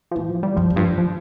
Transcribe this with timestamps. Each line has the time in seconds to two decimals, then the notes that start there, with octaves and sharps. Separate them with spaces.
0.11 F3
0.16 A2 E3
0.30 F3
0.43 G3
0.57 G2 F3
0.70 F2
0.76 G2 F3
0.98 F3